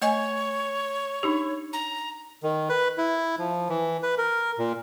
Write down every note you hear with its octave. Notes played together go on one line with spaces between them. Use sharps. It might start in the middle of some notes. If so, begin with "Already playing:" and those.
A3 C#5 D#5 G#5
D4 D#4 G4
A#5
D#3
B4
E4
F3
E3
B4
A#4
A#2